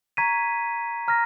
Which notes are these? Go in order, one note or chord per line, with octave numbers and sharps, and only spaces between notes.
A#5 C#6 G#6 B6 D#7
A#5 F6 A#6